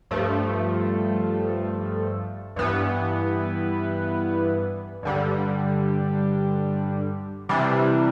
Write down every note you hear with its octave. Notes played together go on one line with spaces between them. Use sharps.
G2 F3 A3
G2 E3 B3
G2 D3 G3
C3 E3 G3 D4